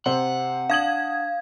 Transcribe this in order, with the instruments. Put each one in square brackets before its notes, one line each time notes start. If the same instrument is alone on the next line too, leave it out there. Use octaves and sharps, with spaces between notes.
[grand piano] C3 C5 G7 [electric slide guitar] F#5
[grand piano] D4 D#6 F#7 [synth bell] F5 G#6